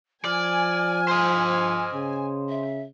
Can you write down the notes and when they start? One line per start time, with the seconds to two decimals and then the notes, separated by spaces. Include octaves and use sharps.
0.25 F3 D5 G#5 F6
1.08 C5 D#5
1.93 C#3
2.49 E5